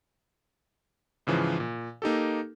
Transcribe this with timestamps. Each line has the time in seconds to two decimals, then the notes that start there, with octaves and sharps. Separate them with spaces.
1.27 G#2 C#3 E3 F3
1.60 A#2
2.02 A#3 D#4 G4 A4